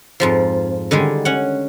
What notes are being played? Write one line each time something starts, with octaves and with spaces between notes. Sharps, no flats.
F2 G#2 F3
D3 D#3 G3 G#3
C#4 F#5